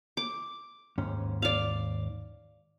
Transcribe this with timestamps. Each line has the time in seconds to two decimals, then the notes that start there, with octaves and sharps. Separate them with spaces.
0.17 D6
0.98 D#2 G#2 C#4
1.42 D5 F5